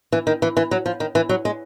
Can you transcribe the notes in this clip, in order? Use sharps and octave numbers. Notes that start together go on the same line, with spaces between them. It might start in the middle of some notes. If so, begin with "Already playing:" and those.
E3
D#3
E3
E3
F#3
F3
D#3
E3
F#3
G#3